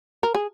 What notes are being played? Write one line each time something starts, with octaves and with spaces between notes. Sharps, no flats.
A#4
G#4